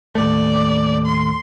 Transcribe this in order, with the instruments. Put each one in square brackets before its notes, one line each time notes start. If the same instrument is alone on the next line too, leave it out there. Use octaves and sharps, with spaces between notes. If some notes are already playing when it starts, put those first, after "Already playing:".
[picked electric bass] D#2 A2 A3 [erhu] D5
[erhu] C6